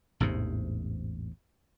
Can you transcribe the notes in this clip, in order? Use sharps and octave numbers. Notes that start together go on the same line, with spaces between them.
A1 E2 G#2 C3